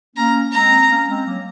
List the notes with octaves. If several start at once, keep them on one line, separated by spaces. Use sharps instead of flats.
A#3 C#4 A#5
G#3 C4 A#5
A#3 C#4
G#3 C4
F#3 A#3